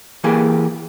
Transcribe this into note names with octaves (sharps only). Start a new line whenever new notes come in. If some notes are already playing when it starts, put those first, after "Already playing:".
E3 A#3 G4 G#4